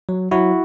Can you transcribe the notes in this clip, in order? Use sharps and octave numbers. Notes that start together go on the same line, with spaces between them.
F#3
F#3 E4 F#4